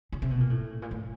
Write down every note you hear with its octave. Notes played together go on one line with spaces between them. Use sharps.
C#3
C3
B2
A#2
A2
A#2
A2